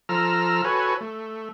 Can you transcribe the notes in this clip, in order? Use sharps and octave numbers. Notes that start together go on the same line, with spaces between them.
F3 A4 A#5 E6 F6
F#4 A4 B4 C#5 G#5
A3